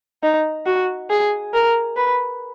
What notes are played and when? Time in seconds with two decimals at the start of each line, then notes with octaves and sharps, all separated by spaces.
0.23 D#4
0.66 F#4
1.10 G#4
1.53 A#4
1.96 B4